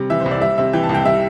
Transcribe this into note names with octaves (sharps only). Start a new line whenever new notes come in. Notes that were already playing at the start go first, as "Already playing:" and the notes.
Already playing: C3 G3
E3 E5
C5
C2
D5
G3 E5
C3 E5
E3 G5
A5
C2
G5
G3 E5